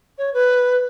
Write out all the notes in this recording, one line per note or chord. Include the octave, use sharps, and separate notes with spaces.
C#5
B4